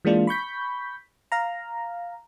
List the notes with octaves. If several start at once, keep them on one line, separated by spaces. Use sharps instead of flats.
E3 G#3 A#3 D4 F4
B5 C#6 G6 B6
F5 A#5